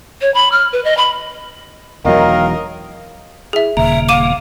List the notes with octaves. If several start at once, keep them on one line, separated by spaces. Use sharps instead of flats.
C#5
B5
F6
B4
D#5
B5
E1 E2 D#3 F#3 A#4 D#5 F5
E4 G#4 E5
D#1 C#3 A#3 E5 A#5
F5 D6 D#7 E7